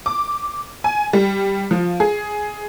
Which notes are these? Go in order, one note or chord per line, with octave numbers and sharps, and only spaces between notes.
D6
G#5
G3
F3
G#4